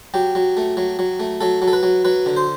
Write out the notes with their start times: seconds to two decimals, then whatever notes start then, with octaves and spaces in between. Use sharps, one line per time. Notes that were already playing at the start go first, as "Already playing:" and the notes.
0.14 F#3 G4
0.35 F#3
0.57 A3
0.77 F#3
0.99 F#3
1.20 A3
1.41 F#3 A4
1.62 F#3
1.68 A4
1.73 B4
1.83 F#3
2.04 F#3 B4
2.26 D3
2.36 C5